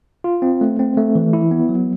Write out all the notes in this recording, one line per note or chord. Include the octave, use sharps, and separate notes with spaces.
F4
C4
A3
C4
A3
E3
E4
B3
F#3